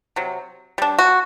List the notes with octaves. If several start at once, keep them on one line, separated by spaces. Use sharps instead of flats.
C3 F#3
G3 D4
F#4